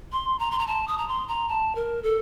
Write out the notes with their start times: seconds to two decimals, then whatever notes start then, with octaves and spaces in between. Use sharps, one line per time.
0.12 C6
0.39 A#5
0.51 C6
0.59 A#5
0.67 A5
0.88 D#6
0.98 A#5
1.08 C6
1.28 A#5
1.49 A5
1.75 A#4
2.03 A4